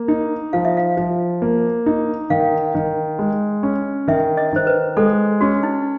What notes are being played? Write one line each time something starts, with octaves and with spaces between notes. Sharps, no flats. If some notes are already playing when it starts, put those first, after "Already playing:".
Already playing: A#3
D#4
F3 F5
E5
F5
F3
A#3
D#4
D#3 F5
D#3
G#3
C#4
D#3 E5
D#5
D#3 C5
B4
G#3 A4
C#4 F#4
D#4